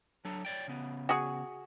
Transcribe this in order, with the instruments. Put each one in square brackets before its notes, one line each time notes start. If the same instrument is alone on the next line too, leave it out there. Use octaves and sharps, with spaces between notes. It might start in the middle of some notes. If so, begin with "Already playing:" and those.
[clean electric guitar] F#3 D4 A4
C#5 D5 G5
C#3 B3
[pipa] F#4 G#4